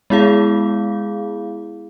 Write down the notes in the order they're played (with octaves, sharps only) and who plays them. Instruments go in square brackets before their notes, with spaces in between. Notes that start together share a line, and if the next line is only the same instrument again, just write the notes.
[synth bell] G#3 B3 E4 G#4 F5